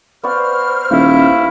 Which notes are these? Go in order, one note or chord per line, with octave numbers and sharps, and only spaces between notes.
B3 C5 D5 C#6 F6
D#1 E4 F5